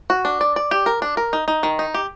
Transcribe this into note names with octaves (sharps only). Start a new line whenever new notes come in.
F#4
D4
D5
D5
G4
A#4
D4
A#4
D#4
D#4
D#3
D#4
G4